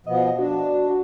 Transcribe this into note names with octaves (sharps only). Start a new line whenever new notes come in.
B2 F3 B3 D#5
D4 F#4
F#4